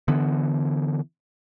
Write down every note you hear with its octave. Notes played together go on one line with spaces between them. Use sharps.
D3 E3 B3